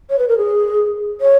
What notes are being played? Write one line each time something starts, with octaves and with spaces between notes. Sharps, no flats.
C#5
B4
A#4
G#4
C#5